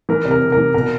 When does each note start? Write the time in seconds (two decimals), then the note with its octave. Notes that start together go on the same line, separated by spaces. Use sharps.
0.09 E3 A#4
0.25 C3
0.31 A#4
0.41 C3
0.52 A#4
0.58 E3
0.74 B2 A#4